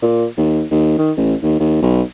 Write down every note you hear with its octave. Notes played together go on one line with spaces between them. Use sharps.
A#2
D#2
D#2
D#3
A1
D#2
D#2
B1